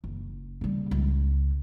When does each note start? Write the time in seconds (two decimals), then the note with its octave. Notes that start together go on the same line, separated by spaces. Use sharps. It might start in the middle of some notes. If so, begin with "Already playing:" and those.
0.04 F#1
0.61 C#3 G3
0.91 C#2